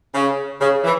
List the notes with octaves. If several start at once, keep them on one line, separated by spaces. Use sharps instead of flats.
C#3
C#3
E3